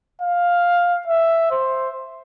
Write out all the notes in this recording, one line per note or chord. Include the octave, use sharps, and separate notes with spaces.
F5
E5
C5